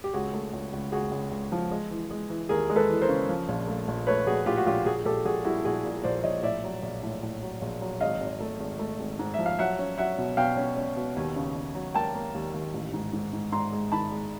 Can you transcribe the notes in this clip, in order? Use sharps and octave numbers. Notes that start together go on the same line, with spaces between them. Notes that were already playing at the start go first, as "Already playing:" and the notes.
G4
C#2 F#4 G#4
A3
C#2
C#2
C#2 F#4 G#4
C#2
C#2
F3
G#3
E3
G#3
E3
D#2 G#4 A#4
G#3
A4 B4
E3
A#4 C5
C#3
F3
A#1
A3
A#1
A3 B4 C#5
A#1 F#4 G#4
A2 F4 G4
F#4
A#1 F4 G4
A#1 F#4 G#4
A#1 G4 A4
A#1 F#4 G#4
G3 E4 F#4
A#1 F#4 G#4
A#2
A#1 C5 D5
A#1 C#5 D#5
A2 D5 E5
F#3
A#1
A2
A2
F#3
A#1
F#3
G#1 D#5 F5
G#1
A3
G#1
A3
G#1
G#2
F3 E5
F5
F#3 E5 F#5
C#4
F#3 E5 F#5
B2
B2 F5 G5
C#4
C#4
B2
D#2
C#3
C#3
F#3
A#3 G5 A5
A#3
D#2
D#2
A1
G#2
G#2
G#2
G#2 A#5 C6
G#3
D#3 A5 B5
G#3